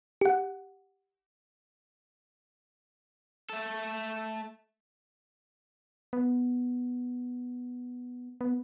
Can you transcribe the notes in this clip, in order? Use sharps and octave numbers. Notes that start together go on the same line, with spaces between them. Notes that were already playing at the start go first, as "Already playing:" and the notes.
G4 F#5
A3 A4
B3
B3